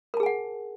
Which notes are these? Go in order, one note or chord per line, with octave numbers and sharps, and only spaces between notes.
G#4 A#4 F#5 G#5 A5